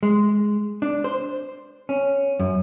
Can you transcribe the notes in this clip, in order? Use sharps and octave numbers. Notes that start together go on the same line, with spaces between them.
G#3
D4
C5
C#4
F#2